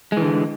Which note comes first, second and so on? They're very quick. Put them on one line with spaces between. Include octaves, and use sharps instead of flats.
G#3 E3 D3